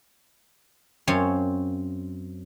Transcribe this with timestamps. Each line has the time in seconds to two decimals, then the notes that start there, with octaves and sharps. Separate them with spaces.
1.07 F#2 C4 C#5 F5